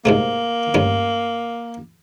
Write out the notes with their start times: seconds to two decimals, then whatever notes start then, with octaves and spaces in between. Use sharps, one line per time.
0.05 G#2 C3 A3 A#3
0.74 D2 G2 C#4